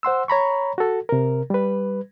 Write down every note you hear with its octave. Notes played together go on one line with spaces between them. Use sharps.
C5 F#5 C6 E6
C#5 A#5 B5 C#6
F#4 A4
C3 A#4
G3 B4